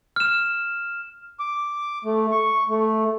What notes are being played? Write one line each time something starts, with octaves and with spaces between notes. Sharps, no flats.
F6 E7
D6
A3
C#6
A3